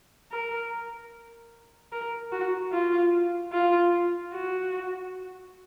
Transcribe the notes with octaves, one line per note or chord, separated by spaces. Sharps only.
A#4
A#4
F#4
F4
F4
F#4